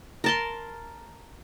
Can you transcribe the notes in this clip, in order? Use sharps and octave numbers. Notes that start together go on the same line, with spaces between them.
A#4 A5 C6